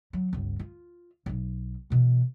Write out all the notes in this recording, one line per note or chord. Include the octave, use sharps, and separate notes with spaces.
F#3
G1 C#2
F4
D1 B1
B2 E3